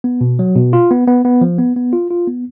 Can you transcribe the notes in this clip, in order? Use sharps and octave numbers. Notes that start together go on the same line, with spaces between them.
B3
B2
F#3
B2
F4
B3
B3
B3
F3
B3
B3
F4
F4
B3